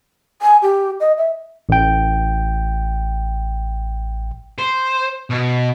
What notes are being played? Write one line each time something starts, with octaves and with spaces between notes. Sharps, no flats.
G#5
G4
D#5
E5
A1 G5
C5
B2